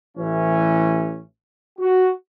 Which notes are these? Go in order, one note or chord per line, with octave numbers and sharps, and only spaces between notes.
A1 E3 C#4
F#4